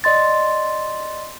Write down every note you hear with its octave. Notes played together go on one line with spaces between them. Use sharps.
D5 D#5 C6 A6